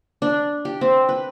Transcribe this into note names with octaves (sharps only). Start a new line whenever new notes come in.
D4
G4
C4
B4